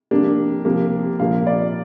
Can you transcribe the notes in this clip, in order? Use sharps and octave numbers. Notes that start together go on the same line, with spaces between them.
F2 C3 A#3 D4
C2 C3 F3 A#3
A#2 F3 A#3 F5
D5